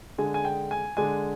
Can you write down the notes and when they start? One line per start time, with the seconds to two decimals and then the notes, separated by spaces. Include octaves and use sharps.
0.18 D3 G#3 D4 G#5
0.34 G#5
0.45 G5
0.71 G#5
0.97 D3 G#3 D4 G#5